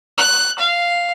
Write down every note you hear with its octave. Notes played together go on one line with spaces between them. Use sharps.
F#6
F5